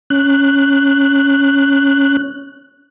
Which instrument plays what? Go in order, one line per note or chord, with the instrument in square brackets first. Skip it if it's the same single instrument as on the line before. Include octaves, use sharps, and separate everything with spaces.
[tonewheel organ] C#4 F#6